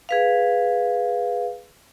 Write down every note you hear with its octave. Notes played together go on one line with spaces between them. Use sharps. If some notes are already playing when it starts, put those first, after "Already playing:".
G#4 B4 F5